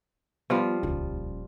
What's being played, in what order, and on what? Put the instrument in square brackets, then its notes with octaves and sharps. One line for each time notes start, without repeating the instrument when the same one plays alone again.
[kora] F3 G3 F4 [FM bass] B3
[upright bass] D#1 C#4 [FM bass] C#2